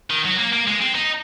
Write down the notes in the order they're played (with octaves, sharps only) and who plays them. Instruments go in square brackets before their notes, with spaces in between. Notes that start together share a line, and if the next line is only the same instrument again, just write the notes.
[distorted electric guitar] D#3
F#3
A#3
A#3
G#3
C4
D#4